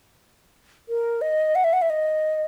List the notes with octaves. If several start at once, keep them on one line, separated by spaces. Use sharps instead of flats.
A#4
D#5
F#5
E5
F#5
E5
D#5